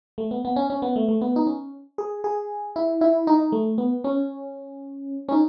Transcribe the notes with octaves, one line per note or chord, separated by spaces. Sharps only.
A3
B3
B3
C#4
C#4
B3
A3
A3
B3
D#4
C#4
G#4
G#4
E4
E4
D#4
A3
B3
C#4
C#4
D#4